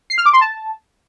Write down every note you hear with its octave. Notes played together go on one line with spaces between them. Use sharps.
C7
F6
D6
C6
A5